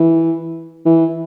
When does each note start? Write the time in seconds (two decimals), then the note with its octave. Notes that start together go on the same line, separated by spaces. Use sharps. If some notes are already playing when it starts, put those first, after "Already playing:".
Already playing: E3
0.86 E3